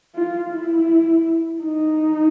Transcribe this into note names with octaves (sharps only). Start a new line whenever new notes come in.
F4
E4
D#4